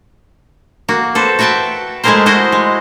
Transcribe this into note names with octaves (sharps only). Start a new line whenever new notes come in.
A#3 F#4
A4 B4 C5
F#4 B4 E5 G5 A5
G#3 A3 E4 G#4 A#4 C5
E4 F#4 C5 D#5
G#3